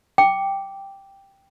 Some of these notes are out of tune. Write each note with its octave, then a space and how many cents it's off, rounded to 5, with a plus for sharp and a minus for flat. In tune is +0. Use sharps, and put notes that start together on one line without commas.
G5 +0 D6 -5